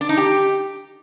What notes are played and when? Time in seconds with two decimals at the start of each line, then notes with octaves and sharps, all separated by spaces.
0.01 D4
0.09 D#4
0.17 G4